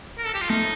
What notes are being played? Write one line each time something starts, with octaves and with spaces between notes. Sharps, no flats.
A#4
A4
G4
F4
A3 D#4